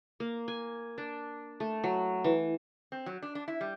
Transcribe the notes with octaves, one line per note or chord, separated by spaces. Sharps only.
A#3
G#5
D4
A3
F#3
E3
C4
F#3
D4
D4
E4
G3